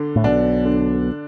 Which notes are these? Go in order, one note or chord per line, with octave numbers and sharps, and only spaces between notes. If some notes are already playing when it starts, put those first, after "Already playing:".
Already playing: D3 D4
A2
B1 B2 D4
D3